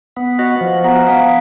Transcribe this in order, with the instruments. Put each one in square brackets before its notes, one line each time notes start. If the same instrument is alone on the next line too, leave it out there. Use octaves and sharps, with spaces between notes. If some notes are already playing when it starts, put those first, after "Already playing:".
[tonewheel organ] B3
[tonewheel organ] F#4 [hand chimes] D#5 F#5
[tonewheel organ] F3
[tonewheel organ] B3 [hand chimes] F#5 A#5
[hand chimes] F#5
[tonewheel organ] B3 [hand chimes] F5 G#5